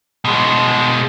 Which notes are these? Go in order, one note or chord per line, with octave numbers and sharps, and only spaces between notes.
B2 G#3